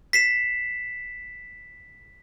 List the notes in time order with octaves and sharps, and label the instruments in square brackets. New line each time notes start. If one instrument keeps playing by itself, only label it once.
[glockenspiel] B6 C7 E7